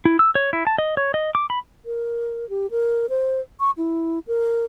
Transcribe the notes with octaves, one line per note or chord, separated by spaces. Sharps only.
E4
E6
C#5
E4
A5
D#5
C#5
D#5
D6
B5
A#4
G4
A#4
C5
C#6
E4
A#4